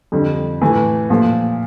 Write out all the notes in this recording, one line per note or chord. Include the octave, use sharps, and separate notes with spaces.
F2 D3 G3
A2 E3 A3
A#2 F3 A3